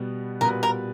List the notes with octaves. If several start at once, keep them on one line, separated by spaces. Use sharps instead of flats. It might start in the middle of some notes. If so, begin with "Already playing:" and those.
Already playing: B2 G3 B3
A#2 G3 B3 F#4 A#4 B4
A#4